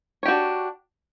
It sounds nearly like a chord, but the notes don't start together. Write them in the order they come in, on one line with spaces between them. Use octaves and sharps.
C#5 G4 F#4 D4